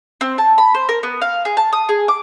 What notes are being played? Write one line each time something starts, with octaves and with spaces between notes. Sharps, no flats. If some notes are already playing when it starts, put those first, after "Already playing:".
C4
A5
B5
C5
A#4
B3
F5
G#4
A5
D#6
G#4
D6